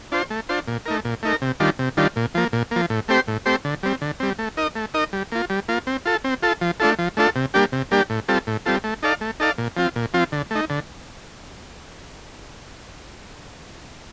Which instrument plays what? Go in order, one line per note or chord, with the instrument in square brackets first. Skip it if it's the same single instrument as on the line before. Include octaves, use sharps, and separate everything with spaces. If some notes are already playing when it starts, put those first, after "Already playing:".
[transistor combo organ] D4 F4 C5
A3
D4 F4 C5
A#2
A3 D#4 A#4
A#2
A3 D#4 A#4
C3
D#3 G3 D4 F4
C3
D#3 G3 D4 F4
A#2
F3 A#3
A#2
F3 A#3
A2
A3 C4 G4 C5
A2
A3 C4 G4 C5
D3
G3 C4
D3
G3 C4
A3
D#4 A#4 D#5
A3
D#4 A#4 D#5
G3
A#3 F4
G3
A#3 F4
C4
F4 A4
C4
F4 A4
F3
A3 D4 F4 A4
F3
A3 D4 F4 A4
C3
G3 A#3 D4 G4
C3
G3 A#3 D4 G4
A2
G3 C4 F4 A4
A2
G3 C4 F4 A4
A3
D#4 A4 D5 F5
A3
D#4 A4 D5 F5
A#2
F3 C4 F4
A#2
F3 C4 F4
D3
A3 D#4
D3